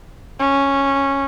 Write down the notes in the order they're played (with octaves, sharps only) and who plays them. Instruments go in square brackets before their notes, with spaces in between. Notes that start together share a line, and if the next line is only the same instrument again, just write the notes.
[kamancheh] C#4